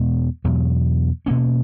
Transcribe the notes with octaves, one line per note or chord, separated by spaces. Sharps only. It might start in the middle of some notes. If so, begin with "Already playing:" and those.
Already playing: E2 B2 G#3 B3
E2 B2 F#3
B2 A#3 C#4